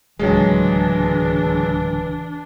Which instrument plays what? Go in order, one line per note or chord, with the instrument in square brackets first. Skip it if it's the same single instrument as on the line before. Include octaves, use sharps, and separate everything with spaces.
[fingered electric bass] D1 C#2 [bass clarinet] E3 [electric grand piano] F#3 G#3 [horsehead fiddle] D4